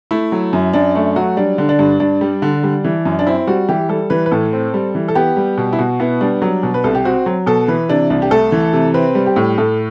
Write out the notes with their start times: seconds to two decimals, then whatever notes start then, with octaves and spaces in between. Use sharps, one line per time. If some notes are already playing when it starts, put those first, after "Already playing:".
0.11 A3 E4
0.32 F#3
0.53 F#2
0.73 F#2 D4
0.95 A3 D4
1.16 F#3 F#4
1.37 G3 D4
1.58 D3
1.69 D4
1.79 G2
2.00 G2 D4
2.21 G3
2.42 D3
2.63 G3
2.84 E3
3.05 F#2
3.19 D4
3.27 C4 E4
3.47 G3 F#4
3.69 E3 G4
3.89 G3 A4
4.10 E3 B4
4.26 B4
4.31 A2 A4
4.53 C4
4.74 G3
4.95 E3
5.08 A4
5.15 B3 G4
5.37 G3
5.58 B2
5.73 E4
5.79 B2 F#4
6.00 B3 E4
6.21 G3 D4
6.42 F#3
6.63 B2
6.74 B4
6.84 C2 A4
6.95 G4
7.05 C4 F#4
7.26 F#3
7.46 B2 A4
7.68 E3 B4
7.89 C3 D4
8.10 C2 D4
8.22 G4
8.31 A3 A4
8.52 E3
8.73 C3
8.94 C4 B4
9.15 G3
9.26 G4
9.36 A2
9.58 A2 A4